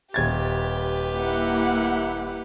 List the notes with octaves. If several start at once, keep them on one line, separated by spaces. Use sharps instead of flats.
D#1 G4 B4 G#6 A6
A#3 E4 F#5